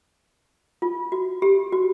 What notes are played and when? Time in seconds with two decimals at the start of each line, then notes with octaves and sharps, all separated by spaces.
0.82 F4
1.12 F#4
1.42 G4
1.72 F#4